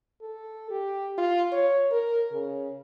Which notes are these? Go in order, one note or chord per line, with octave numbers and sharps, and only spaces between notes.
A4
G4
F4
C#5
A#4
C#3